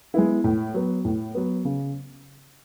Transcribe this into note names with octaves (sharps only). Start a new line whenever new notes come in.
G#3 B3 E4
A2
F#3 B3
A2
F#3 B3
C#3